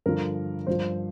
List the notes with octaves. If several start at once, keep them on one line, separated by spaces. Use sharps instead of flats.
G2 D3 F3 A#4
G2 F3 C5